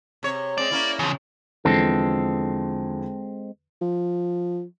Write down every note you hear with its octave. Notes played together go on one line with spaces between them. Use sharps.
C3 C#5
G#3 C4 D5
A#3 C#4 E4
E2 C#3 F3
E2 D3 F3 G#3 C4 A4
F3